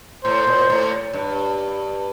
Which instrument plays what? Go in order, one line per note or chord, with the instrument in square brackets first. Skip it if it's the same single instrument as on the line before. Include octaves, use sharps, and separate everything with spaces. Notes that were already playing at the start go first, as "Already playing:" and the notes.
[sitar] A2 [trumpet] C5
[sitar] A#2
A2
G2